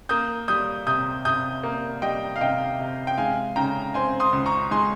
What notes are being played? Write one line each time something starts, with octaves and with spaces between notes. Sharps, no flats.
A#3 D#6 G6
G3 D#6 G6
C3 D#6 G6
C3 D#6 G6
A#3
G3 D#5 G5
F5
C3 D#5 G5
C3
G5
G#3 F5 G#5
C#3 G5 A#5
C4 G#5 C6
C6 D#6
C#2
A#5 C#6
G#3 G#5 C6